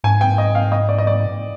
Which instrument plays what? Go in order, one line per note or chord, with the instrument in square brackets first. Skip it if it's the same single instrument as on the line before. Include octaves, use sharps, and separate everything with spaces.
[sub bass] G#2 [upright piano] G#5
[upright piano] G5
D#5
F5
D#5
D5
D#5
D5